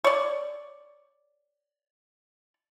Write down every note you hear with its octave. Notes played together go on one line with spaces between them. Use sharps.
C#5 D5